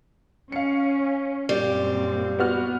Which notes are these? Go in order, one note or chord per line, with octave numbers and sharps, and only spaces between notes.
C#4 F5 C#7
F#2 A#2 G3 C4
B3 F#4 F6